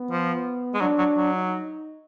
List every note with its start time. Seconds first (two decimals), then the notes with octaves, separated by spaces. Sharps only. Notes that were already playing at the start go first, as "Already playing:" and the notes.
Already playing: B3
0.11 F3
0.74 G#3
0.81 F#3 D4
0.98 F#3
1.17 F#3
1.34 D#4